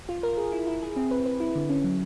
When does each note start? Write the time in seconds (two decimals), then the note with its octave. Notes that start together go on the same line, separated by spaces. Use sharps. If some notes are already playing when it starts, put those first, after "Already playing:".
0.09 F4
0.23 A#4
0.37 G#4
0.52 E4
0.67 E4
0.82 G#4
0.96 C4
1.11 B4
1.26 B4
1.40 E4
1.55 D3
1.69 C#4
1.84 F#3